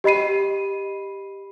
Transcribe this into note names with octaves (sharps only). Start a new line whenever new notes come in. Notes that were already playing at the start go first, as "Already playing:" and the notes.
G4 D#5 B5 C7 D#7